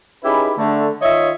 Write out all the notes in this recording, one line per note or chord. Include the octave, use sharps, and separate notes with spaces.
C#4 D#4 E4 G4 G#4 B4
D3 A3
D#3 F4 C#5 D#5 E5